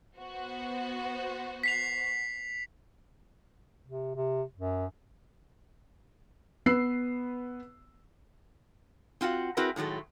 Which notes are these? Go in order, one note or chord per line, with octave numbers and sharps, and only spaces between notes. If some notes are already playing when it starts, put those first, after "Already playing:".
B3 F#4 C5
B6 C7 F7
C3
C3
F#2
B3 B4 E6 C7
C4 F4 F#4 F#5
C4 E4 F#4 G#4 A#4 B4
A2 D#3 F#3 G#3 A3